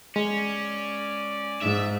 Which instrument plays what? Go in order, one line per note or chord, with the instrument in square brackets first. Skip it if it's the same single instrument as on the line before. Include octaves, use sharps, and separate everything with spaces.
[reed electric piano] G#3 [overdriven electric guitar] C#4 [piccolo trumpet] D5
[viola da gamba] G#2 [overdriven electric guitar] E5